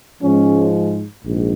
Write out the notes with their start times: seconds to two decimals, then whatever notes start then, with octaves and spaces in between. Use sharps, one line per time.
0.23 G#2 F3 G#3 C#4
1.24 A#1 G#2